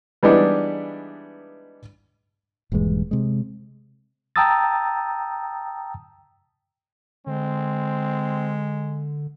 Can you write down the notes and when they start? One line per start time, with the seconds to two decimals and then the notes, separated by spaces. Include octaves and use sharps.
0.23 E3 G3 G#3 B3 D4 D#4
2.72 D#1 G2 E3 G#3
3.11 C3 G#3
4.36 G5 A5 A#5 D#6 E6 A6
7.27 D3 G#3 C4